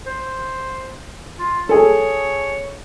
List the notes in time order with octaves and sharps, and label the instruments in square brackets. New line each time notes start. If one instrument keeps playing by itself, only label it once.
[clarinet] C5
F4
[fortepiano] G#4 A4 [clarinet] C#5